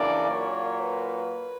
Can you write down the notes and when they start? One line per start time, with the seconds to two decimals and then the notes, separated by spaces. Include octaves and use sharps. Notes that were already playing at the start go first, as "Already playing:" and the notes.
Already playing: F#2 C#3 E3 A#3 D4 D5
0.29 A#2 F#3 A#3 C#5
0.81 B4